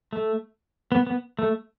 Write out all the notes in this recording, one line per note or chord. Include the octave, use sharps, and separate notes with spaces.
A3
B3
B3
A3